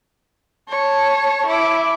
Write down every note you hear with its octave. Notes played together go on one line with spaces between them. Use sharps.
C#5 A5
E4 D6